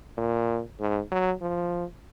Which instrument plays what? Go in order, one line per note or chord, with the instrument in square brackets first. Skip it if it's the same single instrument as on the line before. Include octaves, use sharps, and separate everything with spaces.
[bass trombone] A#2
G#2
F#3
F3